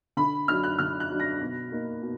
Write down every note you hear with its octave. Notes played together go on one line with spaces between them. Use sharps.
D3 B5
F#3 D4 F6
F#6
D3 F6
F#6
F#3 D4
A#6
B2
A#3 D#4
B2